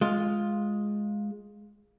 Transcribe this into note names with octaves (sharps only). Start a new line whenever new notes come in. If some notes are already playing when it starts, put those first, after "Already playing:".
G#3 F4